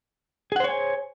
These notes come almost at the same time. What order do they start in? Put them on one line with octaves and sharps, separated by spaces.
G#4 F#5 C5 C#5 G#5